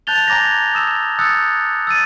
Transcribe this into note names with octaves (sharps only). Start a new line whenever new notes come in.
A5 F#6 G6 A6 F7 G7
G#5 A#5 D6 G#6 A#6
D#6 E6 E7
D#6 E6 F#6 G6 A6 C#7
E6 A6 D#7